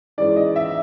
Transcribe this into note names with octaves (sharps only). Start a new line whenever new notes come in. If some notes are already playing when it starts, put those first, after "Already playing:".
G#2 E3 G#3 C#4 D5
D#5
E5